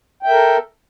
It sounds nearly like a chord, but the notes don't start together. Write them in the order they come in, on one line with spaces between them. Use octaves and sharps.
G5 E5 A#4 A4